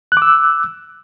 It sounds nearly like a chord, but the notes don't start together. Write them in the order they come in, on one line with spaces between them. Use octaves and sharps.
F#6 D6 E6